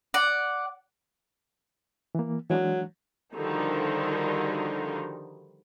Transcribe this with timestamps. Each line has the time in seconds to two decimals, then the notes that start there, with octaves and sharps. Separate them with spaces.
0.14 D5 F#5
2.15 E3 A#3
2.50 E3 F#3 G#3 D4
3.35 D3 D#3 F3 G3 D#4 F#4